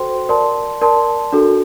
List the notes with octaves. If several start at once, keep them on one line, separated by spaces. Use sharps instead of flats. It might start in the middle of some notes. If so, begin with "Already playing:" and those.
Already playing: F#4 A4 C5 G5 C6
A#4 D5 A5 C6
A#4 D5 A5 C6
D4 F#4 A4